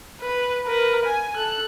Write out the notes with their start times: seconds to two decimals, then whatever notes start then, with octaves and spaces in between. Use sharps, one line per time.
0.21 B4
0.66 A#4 B4
1.06 G#5
1.35 A4 F#6